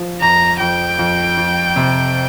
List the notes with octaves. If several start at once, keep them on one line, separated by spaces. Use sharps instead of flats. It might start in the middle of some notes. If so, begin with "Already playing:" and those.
Already playing: F3
F2 A#5
F2 G5
F2
F2
C3